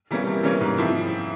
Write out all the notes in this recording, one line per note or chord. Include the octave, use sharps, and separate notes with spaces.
E3 G3 A#3 C#4
C3
E3 G3 A#3 C#4
G#2
F3 C4 E4